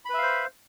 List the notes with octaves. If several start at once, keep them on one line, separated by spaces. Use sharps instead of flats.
B4 C5 E5 F5 B5